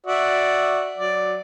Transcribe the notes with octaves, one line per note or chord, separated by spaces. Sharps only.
F#4 D5 E5
F#3 D5